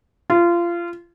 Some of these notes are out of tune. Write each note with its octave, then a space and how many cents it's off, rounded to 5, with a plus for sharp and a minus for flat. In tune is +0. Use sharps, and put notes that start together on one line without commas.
F4 -25